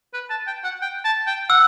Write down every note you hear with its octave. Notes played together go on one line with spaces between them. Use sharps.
B4
A5
G5
F#5
G5
A5
G5
F#5 E6